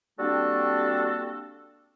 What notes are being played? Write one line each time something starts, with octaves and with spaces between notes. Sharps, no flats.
G3 A#3 C4 D4 F#4 A4